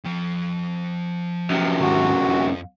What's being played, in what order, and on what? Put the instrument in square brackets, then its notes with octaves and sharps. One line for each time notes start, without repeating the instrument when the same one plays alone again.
[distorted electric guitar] F3 G5
[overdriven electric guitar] F#2 C3
[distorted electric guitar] D#2 G#2 [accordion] F#4
[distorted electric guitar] F2